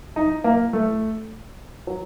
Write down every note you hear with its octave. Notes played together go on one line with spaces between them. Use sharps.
D#4
A#3
A3
F#3